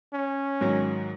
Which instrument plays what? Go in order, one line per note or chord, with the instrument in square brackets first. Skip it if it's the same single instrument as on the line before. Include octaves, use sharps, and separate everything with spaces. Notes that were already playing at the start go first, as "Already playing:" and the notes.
[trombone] C#4
[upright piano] G#2 D#3 F#3